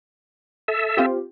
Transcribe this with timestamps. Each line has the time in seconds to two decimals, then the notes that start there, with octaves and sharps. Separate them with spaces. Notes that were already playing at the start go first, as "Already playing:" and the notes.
0.68 A4 E5
0.97 C4 F4 G4